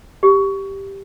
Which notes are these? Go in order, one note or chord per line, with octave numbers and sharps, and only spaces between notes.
G4